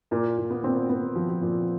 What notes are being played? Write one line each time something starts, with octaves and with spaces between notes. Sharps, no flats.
A#2 A#3
A#2
B3
A#2 C4
B3
A#2 B3
F3
F3
A#2